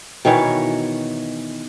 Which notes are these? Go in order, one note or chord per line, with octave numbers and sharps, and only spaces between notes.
B2 D#3 E3 C#5